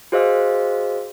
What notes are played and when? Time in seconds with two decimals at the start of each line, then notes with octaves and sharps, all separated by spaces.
0.12 F#4 G#4 C5 D#5 F5 E6